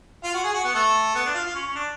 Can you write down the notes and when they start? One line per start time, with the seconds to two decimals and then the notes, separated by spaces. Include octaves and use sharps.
0.23 F4
0.34 F#4
0.44 G#4
0.54 F#4
0.64 B3
0.75 A3
1.15 B3
1.25 D4
1.34 F4
1.45 F4
1.54 C#4
1.65 C#4
1.75 D4